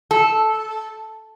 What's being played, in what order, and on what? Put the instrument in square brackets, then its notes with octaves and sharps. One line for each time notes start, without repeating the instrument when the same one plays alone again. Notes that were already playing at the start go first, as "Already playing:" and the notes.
[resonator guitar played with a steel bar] A4